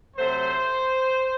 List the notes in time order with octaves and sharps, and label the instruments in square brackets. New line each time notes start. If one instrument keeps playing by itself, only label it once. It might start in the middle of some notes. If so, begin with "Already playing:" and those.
[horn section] C3 F#3 A3 C5